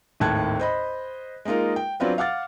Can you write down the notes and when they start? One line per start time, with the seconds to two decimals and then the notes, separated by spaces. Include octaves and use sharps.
0.20 G#1 D#2 A2 A5 F#6 G#6
0.59 C5 D#5 B5
1.45 G#3 A#3 D#4 F4 A#4
1.76 G5
2.00 F#3 C4 D4 F4 B4
2.18 F5 F#5 D6 F6 A6